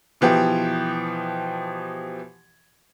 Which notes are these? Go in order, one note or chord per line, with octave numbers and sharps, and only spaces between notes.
B2 E3 F3 G4